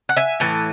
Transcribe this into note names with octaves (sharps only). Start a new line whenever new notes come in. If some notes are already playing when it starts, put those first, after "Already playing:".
F#5
E5 G#5
A2 E3